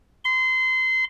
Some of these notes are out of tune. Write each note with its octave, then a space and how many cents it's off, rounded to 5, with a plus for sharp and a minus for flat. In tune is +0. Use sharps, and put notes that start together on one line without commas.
C6 -25